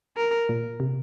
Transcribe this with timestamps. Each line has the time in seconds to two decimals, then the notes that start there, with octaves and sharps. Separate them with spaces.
0.17 A#4
0.49 A#2
0.80 C3